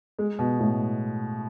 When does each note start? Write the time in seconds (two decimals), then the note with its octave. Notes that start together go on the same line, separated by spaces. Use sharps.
0.19 G#3
0.39 B2
0.60 A2